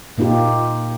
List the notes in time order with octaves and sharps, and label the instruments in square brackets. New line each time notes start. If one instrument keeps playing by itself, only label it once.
[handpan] A#2 A#3 D#4 F4 G4